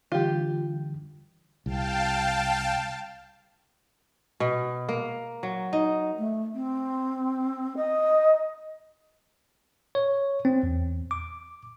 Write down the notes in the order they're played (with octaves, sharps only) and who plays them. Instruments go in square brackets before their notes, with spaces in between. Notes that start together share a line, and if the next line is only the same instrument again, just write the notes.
[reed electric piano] D3 E3 G3 [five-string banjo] F4 G4
[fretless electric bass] C2 [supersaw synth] F5 G5 A5
[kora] B2
A#3
F#3
D#4
[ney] A3
C4
D#5
[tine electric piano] C#5
C4
E2
D6